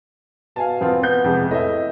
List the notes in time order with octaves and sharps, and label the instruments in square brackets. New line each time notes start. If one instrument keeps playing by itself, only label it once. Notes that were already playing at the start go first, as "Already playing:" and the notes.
[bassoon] B2 [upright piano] F5 G#5 A5
[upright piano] E1 C4 F4 [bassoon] B3
[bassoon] B3 [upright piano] G6
[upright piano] F2 C3 G#3
[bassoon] A2 [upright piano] D#5 E5